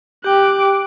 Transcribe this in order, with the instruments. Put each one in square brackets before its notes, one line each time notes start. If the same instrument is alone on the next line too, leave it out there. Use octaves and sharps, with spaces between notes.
[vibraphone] G4 G5 [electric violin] D6 F#6